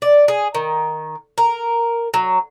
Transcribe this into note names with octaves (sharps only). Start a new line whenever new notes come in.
D5
G#4
D#3
A#4
F#3